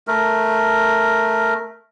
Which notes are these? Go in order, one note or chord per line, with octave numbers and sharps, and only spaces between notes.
A3 A#4